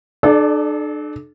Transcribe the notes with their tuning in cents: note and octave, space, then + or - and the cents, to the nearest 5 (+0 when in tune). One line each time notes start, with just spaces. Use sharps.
D4 +40 A4 -35 D5 +0